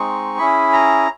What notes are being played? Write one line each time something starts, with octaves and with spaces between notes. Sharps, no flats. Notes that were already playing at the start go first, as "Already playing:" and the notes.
Already playing: G#3 C4 D#4 C#6
C#4 E4 G#4 B5
A#5